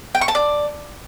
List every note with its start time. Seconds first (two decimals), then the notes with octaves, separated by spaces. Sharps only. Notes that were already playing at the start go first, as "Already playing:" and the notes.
0.15 G5
0.21 C#6
0.28 A5
0.35 D5